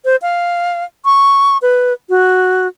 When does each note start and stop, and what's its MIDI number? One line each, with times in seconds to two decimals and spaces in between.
0.05 0.16 72
0.22 0.84 77
1.05 1.58 85
1.62 1.93 71
2.09 2.67 66